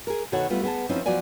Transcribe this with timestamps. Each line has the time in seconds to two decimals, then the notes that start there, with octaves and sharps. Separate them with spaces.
0.07 G#4 A#4
0.32 B2 D#3 F#4 A4 C#5 F#5
0.50 G3 A3 B3 F4
0.63 B3 G#4 A5
0.89 F3 C4 C#4 D#4 E4
1.06 F3 F#3 B3 F#4 D5 G#5